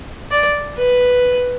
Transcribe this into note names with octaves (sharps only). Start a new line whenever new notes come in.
D5
B4